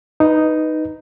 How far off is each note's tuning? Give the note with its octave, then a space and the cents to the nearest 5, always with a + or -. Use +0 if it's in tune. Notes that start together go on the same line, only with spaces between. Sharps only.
D#4 +0 B4 +0